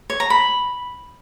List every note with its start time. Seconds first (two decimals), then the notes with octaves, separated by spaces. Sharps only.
0.10 C#5
0.20 A#5
0.30 B5